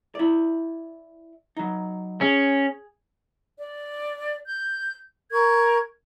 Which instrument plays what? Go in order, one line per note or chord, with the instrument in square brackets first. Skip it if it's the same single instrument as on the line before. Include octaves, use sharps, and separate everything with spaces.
[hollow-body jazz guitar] E4 D5
F#3 D#4
[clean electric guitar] C#4 [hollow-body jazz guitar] G#4
[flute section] D5
G6
A#4 C#6 G#6